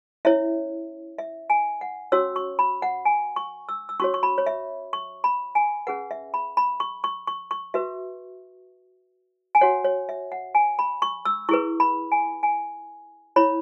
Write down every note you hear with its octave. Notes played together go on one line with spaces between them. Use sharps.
C#4 E4 C#5 E5
E5
G#5
F#5
C#4 F#4 C#5 E6
C#6
B5
F#5
G#5
C#6
E6
E6
C#4 F#4 C#5 C#6
C#6
B5
C#5
E5
C#6
B5
G#5
C#4 G#4 B4 F#5
E5
B5
B5
C#6
C#6
C#6
C#6
F#4 B4 E5
G#5
F#4 C#5 F#5
C#5
E5
F#5
G#5
B5
C#6
E6
E4 G#4 B4 C#6
B5
G#5
G#5
E4 C#5 B5